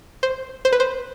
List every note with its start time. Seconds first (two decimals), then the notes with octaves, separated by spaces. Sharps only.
0.23 C5
0.65 C5
0.72 B4
0.80 C5